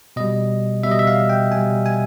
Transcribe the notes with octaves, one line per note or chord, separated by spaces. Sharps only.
B2 G3 D#5
B2 G3 E5
D#5
E5
F5
G5
B2 G3 G#5
G#5